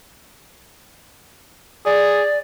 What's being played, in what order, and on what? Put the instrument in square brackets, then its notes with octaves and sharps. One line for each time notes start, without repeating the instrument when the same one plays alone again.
[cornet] G#4 [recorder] D5